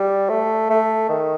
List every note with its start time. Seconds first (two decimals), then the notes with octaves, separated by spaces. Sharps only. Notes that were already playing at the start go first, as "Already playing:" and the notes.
Already playing: G3
0.30 A3
0.70 A3
1.09 D#3